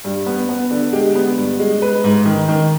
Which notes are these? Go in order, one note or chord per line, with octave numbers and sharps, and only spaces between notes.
G2
B3
B3
D3
G#3 G4
B3
G2
G#3
G#3 B4
G#2
D#3
D#3